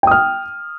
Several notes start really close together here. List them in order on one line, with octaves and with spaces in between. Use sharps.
G5 D#6 F6